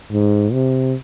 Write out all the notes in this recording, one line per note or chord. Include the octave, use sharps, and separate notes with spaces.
G#2
C3